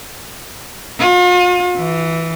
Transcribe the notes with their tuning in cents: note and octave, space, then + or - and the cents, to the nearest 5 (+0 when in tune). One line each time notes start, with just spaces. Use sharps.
F4 +40
E3 -5